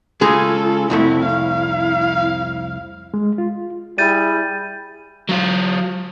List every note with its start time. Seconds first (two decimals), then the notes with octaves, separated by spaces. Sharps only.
0.21 C#3 G#3 F4 G#4 A4
0.90 C2 F2 A3 C4 E4
1.25 E4 F5
3.14 G#3
3.38 F4
3.98 G3 E4 G#4 G6 A6 D#7
5.29 F#3 F4